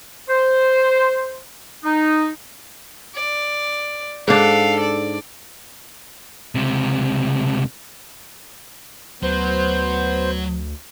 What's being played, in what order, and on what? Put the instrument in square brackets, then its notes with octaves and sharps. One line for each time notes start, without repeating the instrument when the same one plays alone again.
[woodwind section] C5
D#4
[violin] D5
[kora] G#2 D4 [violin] A4 F5
[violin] D5
[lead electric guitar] C#2 C3
[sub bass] D2 [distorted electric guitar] F#3 [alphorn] B3 [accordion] C5